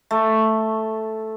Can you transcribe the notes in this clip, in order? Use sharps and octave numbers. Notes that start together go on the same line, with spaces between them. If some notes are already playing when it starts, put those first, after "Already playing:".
A3